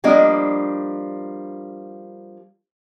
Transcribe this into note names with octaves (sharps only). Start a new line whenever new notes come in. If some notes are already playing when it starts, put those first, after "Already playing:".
F3 G3 A#3 D4 D#5